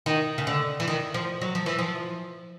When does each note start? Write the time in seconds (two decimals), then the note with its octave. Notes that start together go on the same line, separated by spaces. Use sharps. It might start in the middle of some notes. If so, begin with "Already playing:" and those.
0.06 D#3
0.38 C#3
0.47 D3
0.80 E3
0.88 D#3
1.14 F3
1.41 F#3
1.55 F3
1.66 E3
1.78 F3